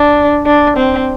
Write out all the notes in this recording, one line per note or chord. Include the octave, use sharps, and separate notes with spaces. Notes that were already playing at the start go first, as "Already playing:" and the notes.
Already playing: D4
D4
C4